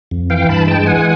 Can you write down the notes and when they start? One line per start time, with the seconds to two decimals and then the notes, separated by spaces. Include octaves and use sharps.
0.11 F2
0.30 E3 F5 G5
0.49 G2 A5 B5
0.67 G#3 G5 A5
0.86 E3 F#5 G#5